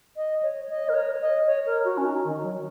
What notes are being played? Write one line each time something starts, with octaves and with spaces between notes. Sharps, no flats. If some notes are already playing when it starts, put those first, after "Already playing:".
D#5
C#5
D#5
A#4
C#5
D#5
C#5
A#4
F#4
C#4
D#4
D#3
F#3